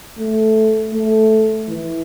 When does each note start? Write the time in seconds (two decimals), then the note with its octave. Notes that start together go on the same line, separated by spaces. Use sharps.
0.18 A3
0.93 A3
1.69 E3